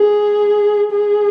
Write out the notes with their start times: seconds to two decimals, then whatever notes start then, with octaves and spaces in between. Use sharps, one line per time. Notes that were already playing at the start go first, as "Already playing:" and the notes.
Already playing: G#4
0.92 G#4